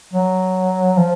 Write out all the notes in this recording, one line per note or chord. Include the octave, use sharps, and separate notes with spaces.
F#3
F3